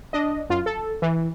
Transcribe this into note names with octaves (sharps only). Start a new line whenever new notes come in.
D4 D#5
F#2 F4
A4
E3